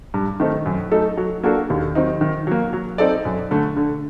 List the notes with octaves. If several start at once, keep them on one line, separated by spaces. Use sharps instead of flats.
G2
D#3 A3 C4 D#4
F#2
F#3 A3 D#4 A4
F#3
A#3 D4 F#4 A4
D#2
D#3 F#3 C4 D#4
D#3
F#3 A#3
F#3
C4 D#4 A4 D5
F#2
D3 A3
D3